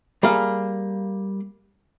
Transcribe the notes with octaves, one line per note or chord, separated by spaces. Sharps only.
G3 A#3 G#4 F5